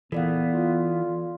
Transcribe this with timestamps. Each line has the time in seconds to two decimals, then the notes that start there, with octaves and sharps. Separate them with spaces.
0.12 E2 A#2 E3 B3 A4 D5 F5
0.54 F4